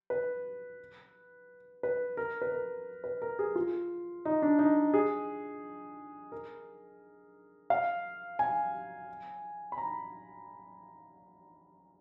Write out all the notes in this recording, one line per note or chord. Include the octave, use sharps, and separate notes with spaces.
B4
B4
A#4
B4
A#4
B4
A#4
G#4
F4
D#4
D4
D#4
G#4
A#4
F5
G#5
B5
A#5